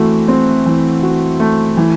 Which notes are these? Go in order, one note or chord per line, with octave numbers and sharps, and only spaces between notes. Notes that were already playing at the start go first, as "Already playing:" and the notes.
Already playing: E3 A3 C4 F#4
C4
E3
F#4
A3
E3